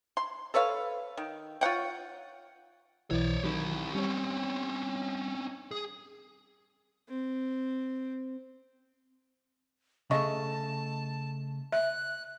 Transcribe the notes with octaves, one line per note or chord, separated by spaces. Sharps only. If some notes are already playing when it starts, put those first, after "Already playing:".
C6
A4 B4 C#5 F5
D#3
F4 C#5 F#5 G5
B1 E3 C#5 D5
D#3 F#3 E4 G4
G3 C4 C#4 C#5
G#4
C4
C#3 A3 D#5 A5 C#6
E5 F#6